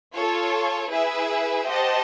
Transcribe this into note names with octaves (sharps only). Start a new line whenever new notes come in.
F4 A4 C#5
E4 G#4 B4 E5
G4 C5 D#5 F#5 A5